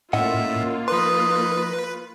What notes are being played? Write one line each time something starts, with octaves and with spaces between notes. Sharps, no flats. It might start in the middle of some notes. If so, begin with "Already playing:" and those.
A2 A#3 C#4 F4 D#5 E5 F#5
F3 D#4 B4 C6